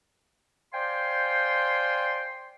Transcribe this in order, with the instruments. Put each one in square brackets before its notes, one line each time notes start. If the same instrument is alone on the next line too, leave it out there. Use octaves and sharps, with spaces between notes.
[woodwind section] C5 D5 F5 G5 G#5 C6